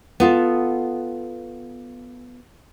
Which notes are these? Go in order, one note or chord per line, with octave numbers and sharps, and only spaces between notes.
B3 F4 A4